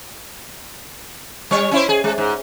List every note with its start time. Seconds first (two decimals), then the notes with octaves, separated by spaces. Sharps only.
1.51 G3 C#5
1.71 C#4 E4 C5
1.89 G#4
2.04 G#3
2.18 G#2